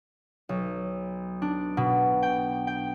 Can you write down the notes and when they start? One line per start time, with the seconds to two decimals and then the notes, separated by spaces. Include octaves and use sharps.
0.49 B1
1.42 D4
1.77 B2
2.23 G5
2.67 G5